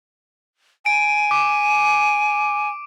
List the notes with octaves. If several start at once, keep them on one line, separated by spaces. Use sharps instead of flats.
G#5 D7 D#7
D6